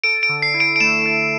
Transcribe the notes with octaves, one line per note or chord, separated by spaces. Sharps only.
A4 D7
D7
D3
C7
E4
D7
D7
A3 E7
A4